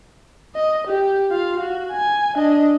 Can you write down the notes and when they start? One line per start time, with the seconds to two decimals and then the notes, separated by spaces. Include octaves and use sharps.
0.55 D#5
0.87 G4
1.31 F4 F5
1.60 F#4
1.92 G#5
2.35 D4 D#5